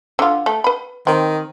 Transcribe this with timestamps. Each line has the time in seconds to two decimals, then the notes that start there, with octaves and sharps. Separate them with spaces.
0.19 D3 F4
0.46 A3
0.64 B4 B5
1.07 D#3 C4